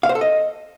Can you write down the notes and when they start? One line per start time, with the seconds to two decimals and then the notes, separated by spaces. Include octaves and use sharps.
0.03 F5
0.09 C5
0.15 A4
0.21 D#5